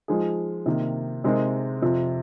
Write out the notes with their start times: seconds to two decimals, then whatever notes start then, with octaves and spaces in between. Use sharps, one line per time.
0.08 F3 G#3 D#4 G#4
0.66 C3 D#3 A#3
1.24 C3 G#3 C4 D#4 A#4
1.82 F2 C3 F3